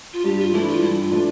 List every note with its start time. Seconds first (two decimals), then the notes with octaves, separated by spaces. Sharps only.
0.13 F4
0.24 G2 G4
0.39 F4
0.53 E3 A3 D4 E4
0.68 F4
0.82 G2 E4
1.01 F4
1.11 E3 A3 D4